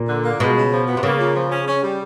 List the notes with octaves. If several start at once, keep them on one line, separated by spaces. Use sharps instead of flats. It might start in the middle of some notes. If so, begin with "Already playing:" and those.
Already playing: A#2
D3
A#3
B2 G#3
C#3
F3
B3
C3
C#3 A#3
A#2
F3
C#4
C#4
G3